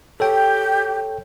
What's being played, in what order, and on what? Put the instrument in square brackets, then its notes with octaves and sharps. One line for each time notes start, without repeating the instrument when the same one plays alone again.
[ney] G4 [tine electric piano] A4 C#5 G5